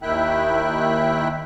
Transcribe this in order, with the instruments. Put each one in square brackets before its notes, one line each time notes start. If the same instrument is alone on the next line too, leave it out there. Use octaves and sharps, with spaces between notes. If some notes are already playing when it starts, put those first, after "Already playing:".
[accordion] D#2 D#3 E4 E5 G5 F#6